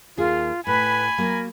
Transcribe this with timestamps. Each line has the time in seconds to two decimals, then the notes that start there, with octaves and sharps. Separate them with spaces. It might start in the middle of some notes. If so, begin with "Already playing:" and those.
0.18 D#2 F4 G#4
0.67 A2 B4 G#5 B5
1.18 F#3 A#3 A#4